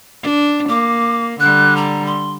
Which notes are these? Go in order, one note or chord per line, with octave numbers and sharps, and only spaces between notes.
D4
A#3 D6
D3 G3 F#6
A#5
C6